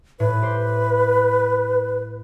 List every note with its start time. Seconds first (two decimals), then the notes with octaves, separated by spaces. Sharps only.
0.20 A2 B4
0.42 G4 C5